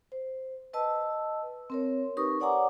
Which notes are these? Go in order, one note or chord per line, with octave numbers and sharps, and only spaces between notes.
C5
B4 D#5 A5 E6
C4 A#4 C#5
D#4 G4 A#4 B4 C#6 D#6
C#5 D5 F#5 G#5 A#5 D6